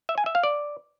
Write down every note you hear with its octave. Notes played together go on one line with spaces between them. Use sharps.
E5
G#5
E5
F5
D5